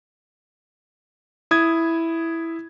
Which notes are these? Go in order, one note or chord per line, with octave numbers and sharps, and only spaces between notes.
E4 D#6 G#6